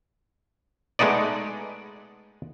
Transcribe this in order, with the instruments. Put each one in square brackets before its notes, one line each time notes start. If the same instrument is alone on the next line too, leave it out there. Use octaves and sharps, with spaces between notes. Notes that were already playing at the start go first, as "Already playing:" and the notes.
[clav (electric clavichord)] G#3 A3 B3 D#4 D5